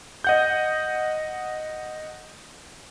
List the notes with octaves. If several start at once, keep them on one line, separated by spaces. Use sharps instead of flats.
D#5 F#5 G6